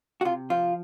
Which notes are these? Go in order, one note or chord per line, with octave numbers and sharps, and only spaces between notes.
F#4
C3 F4
F3 F4